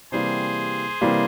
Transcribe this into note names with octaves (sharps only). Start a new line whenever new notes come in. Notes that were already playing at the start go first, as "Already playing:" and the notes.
C3 E3 G3 A#3 G#4 C5
C3 E3 G3 A#3